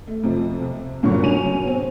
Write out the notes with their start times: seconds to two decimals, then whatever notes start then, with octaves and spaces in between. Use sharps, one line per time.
0.07 A3
0.23 F2 C3 F3
0.61 C3
1.03 G2 A#2 D3 F#3 F#4 C#6
1.21 F#1 F#3 C#4 G#5 D#7 F7
1.64 B3 C4